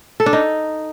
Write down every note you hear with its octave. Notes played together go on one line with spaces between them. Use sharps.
A4
D4
D#4